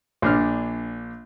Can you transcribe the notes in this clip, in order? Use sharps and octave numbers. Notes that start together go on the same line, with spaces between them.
A#1 D4 F6